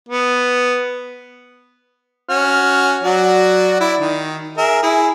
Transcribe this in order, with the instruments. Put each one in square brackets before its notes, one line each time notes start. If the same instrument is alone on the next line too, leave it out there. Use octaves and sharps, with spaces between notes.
[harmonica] B3
C#4 F#4 F6
F#3 F#4 D5
E4 D5
D#3
G#4 A#4 E5
E4 G#4